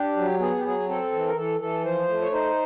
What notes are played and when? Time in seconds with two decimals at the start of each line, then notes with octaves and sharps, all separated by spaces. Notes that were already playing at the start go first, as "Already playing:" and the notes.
Already playing: D4 G4
0.17 F#3
0.40 B3 G#4
0.58 G4
0.64 F#3 G#4
0.88 C4 A4
1.13 E3
1.27 A#4
1.36 E3 A4
1.60 E3 A4
1.84 F3 C5
2.08 A3
2.21 C#5
2.32 D#4 C5